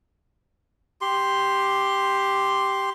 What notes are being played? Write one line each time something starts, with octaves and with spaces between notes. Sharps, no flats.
G4 C6